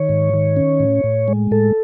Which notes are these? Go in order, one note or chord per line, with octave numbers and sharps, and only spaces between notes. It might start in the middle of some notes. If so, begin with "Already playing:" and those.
Already playing: D#3 C#5
G#2
D#3
C#4
A2
A2
G#3
A2 A4